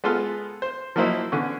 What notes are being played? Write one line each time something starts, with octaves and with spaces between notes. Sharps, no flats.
G#3 B3 F4 A4 C6 F6
C5
F3 F#3 A#3 D#4 E4 C5
D3 B3 C#4